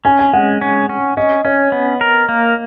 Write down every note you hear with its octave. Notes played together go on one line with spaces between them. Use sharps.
C#4 G#5
G#5
G#3 F#5
C#4
C#4
C#4 D#5
C#4 C#5
B3
A#4
A#3